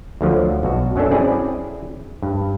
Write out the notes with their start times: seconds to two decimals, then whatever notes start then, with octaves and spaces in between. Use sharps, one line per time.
0.21 D2 D3 F3 F#3
0.63 B1 F#4
0.96 F#2 F#3 C#4 D4 A4
1.11 C4 C#4 E4 G#4 D5
2.23 G2